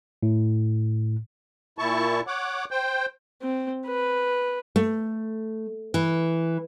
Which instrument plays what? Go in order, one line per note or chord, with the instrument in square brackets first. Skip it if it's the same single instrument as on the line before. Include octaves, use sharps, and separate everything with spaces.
[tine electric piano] A2
[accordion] A#2 E4 A5 C#6
C#5 F#5 D6
C5 G5
[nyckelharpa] C4
B4
[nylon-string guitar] A3
E3